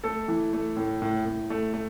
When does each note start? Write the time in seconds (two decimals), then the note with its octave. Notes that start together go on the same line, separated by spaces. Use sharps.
0.04 A3 A4
0.28 E3
0.53 A3
0.77 A2
1.02 A2
1.25 A2
1.50 A3
1.74 A3